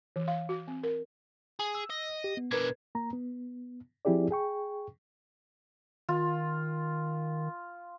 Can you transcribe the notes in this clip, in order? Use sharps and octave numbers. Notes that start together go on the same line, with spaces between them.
E3
F5
F#4
C4
A#4
G#4
E6
D#5
G4
B3
B2 D4 A#4 B4 G#6
A#3 A#5
B3
F3 C4 E4 G4 G#4 D5
G#4 G5 C#6
D#3 F4